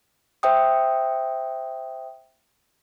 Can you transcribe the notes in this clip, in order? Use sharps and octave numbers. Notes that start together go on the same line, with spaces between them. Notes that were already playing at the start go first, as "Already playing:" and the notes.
C5 E5 G5 D#6